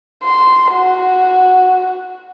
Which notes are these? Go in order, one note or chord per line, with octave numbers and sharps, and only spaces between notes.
C6
F#4